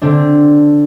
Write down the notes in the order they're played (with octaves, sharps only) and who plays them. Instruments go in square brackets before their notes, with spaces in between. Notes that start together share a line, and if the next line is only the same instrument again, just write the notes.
[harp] D3 C4 D4